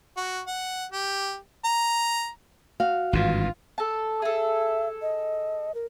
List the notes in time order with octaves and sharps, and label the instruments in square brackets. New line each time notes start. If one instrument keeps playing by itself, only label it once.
[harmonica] F#4
F#5
G4
A#5
[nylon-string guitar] F#4 F5
[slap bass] G#1 G2 E3 [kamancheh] F4
[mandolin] A4 A5
[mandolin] G#4 A4 [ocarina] E5
[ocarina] D#5
A#4